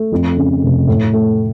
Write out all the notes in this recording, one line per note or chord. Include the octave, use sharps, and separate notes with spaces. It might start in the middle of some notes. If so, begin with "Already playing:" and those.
Already playing: A3
F2
C#3
F1
A2
A3